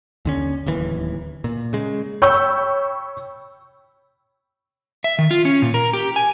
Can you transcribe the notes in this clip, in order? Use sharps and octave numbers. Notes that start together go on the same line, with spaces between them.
D#2 D3 C#4
D1 D#2 E3
A#2
C#3 G#3
C#5 G5 B5 C#6 E6 G6
E5
D#3
F4
C#4
A#2
A#4
G4
G#5